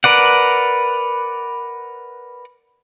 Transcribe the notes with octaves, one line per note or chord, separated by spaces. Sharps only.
A#4 B4 D5 F#5